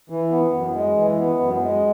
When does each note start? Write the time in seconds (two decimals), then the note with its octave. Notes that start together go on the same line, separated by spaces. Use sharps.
0.10 E3
0.32 B3
0.53 F#2
0.76 G#3
0.97 E3
1.19 B3
1.40 F#2
1.62 G#3